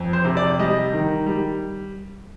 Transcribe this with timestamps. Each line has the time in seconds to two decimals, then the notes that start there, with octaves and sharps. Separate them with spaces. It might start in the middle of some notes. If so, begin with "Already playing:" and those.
Already playing: F2
0.13 C5
0.25 C3
0.37 D5
0.59 G3 D#5
0.93 D#3
1.26 G3